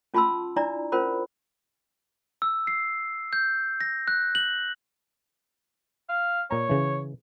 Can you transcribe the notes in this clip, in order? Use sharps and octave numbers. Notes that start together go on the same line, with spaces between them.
C#4 F4 A5 B5 C6 E6
D4 E4 D5 A#5
C#4 F4 A#4 C5 B5
E6
C7
G6
A#6
F#6
F#7
F5
A#2 C#5 A#5
C#3 E3